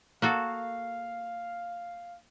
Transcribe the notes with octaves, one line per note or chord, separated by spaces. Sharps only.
A#3 F#4 A4 F5